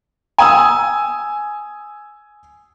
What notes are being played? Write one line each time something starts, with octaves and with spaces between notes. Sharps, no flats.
G#5 D#6 E6